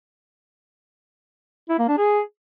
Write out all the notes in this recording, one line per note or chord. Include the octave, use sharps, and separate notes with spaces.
E4
A#3
D4
G#4